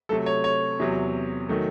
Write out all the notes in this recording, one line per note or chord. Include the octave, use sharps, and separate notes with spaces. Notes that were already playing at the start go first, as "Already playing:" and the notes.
C3 F#3 A3 A4
C#5
C#5
E2 C3 F#3
D#3 F#3 A3